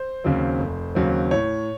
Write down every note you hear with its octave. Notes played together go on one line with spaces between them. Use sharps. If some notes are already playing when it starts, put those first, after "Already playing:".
Already playing: C5
D#2 C#3 F#3 C4
F1
D#2 C#3 F#3 C4
A2 C#5